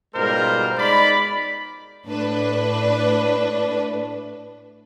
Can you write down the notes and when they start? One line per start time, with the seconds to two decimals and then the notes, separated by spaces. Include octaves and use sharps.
0.15 G#2 B2 G3 F4 A#4 C5
0.78 G#3 D#4 D5 B5
2.05 A2 D4 B4